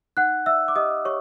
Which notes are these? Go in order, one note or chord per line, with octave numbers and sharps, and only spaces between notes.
D#4 F#5 F#6
D5 E5 E6
D6
G4 D#5 D#6
G4 C#5 C#6